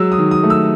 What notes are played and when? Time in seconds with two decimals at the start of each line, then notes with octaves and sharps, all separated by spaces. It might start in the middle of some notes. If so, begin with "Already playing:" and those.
Already playing: F#3 G#3 E6
0.12 D#6
0.18 D#3
0.31 D#6
0.43 A3
0.50 E6